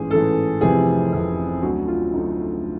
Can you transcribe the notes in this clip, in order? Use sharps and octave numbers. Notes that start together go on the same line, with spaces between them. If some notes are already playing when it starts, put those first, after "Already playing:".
Already playing: A1 G#2 E3 G#4
A1 G#2 E3 A4
F1 F2 C3 E3 G#4
F1 F2 C3 E3
D2 D3 F#3 F#4
F4
D2 D3 F#3 D#4